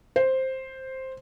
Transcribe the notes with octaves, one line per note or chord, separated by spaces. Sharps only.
C5